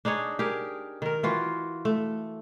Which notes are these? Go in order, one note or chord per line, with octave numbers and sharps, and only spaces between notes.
D4 D#4 G#4 C#5
G4 G#4 A#4
D#3 A#4
E3 F4 F#4
A3